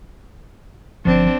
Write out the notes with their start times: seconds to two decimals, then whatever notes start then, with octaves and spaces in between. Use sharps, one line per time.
1.05 G1 F3 C4 D4